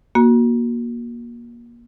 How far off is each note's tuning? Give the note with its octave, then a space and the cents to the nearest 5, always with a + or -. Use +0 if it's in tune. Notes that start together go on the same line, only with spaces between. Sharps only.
A#3 +25 F#4 -10